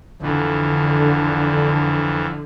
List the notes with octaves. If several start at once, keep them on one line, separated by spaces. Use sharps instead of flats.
F2 D3 E3